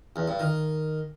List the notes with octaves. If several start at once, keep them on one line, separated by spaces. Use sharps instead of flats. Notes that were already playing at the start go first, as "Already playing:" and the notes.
E2
G2
D#3